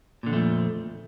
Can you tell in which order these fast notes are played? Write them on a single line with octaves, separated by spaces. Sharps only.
A#2 D3 F2 A3 F3